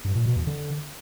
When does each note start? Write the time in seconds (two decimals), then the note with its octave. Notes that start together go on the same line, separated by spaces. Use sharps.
0.05 G2
0.15 A#2
0.26 B2
0.36 E2
0.47 D3